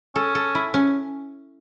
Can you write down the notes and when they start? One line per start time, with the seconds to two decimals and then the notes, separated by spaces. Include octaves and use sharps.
0.15 C#4 A4
0.35 A4
0.55 E4
0.74 C#4